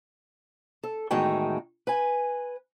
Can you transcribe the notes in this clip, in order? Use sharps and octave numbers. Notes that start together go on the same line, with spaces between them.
A4
E2 A2 D#3 G#3 F#4 G5
B4 G#5